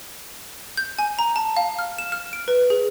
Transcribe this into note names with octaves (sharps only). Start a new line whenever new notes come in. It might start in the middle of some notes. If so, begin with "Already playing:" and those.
G6
G#5
A#5
A5
F5
F6
E7
F6
D7
B4
G#4